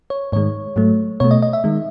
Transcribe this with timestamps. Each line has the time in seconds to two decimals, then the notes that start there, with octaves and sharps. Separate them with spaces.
0.10 C#5
0.32 G#2 D#3 G#3 C#5
0.76 G#2 F#3 A3
1.20 B2 A3 C#5
1.31 D#5
1.42 D#5
1.53 E5
1.64 D#3 G#3